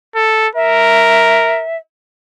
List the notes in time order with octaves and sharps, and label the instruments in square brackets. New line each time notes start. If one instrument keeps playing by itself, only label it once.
[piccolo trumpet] A4
[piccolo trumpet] A#4 [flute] E5